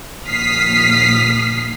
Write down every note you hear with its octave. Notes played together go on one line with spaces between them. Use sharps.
A#1 D#2 D#6 F6 B6 C7